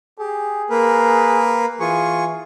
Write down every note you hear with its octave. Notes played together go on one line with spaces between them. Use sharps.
G4 G#4
A#3 A#4 B4
E3 F4 G#4 C#6